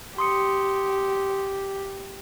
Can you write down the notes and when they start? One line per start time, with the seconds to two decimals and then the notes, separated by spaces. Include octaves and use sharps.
0.18 G4 C6 D#6 C#7